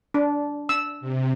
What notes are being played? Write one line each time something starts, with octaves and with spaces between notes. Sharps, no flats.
D4
E6
C3